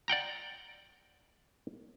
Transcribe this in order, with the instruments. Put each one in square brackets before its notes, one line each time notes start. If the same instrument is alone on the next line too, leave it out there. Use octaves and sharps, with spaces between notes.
[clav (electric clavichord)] D5 F#5 G5 A#5